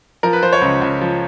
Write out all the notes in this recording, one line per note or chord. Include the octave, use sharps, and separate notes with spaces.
F3 A#4
B4
F3 C5
C#5
C#2
C#2
F3